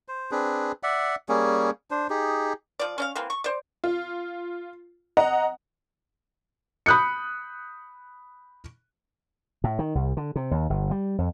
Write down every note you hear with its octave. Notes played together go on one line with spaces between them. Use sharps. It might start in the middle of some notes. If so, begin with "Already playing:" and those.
C5
C4 D4 G#4 B4
D5 E5 F#5
G3 A#3 C#4 G#4
D4 C5
D#4 G4 G#4
F3 D5
C#4 D5 F5
E3 A#3 C4
C#6
C5 D5
F4
D#5 F#5 A#5
B5 D#6 F#6 G6 C#7
A2
D#3
C2
D3
C3
D#2
G1
G3
F2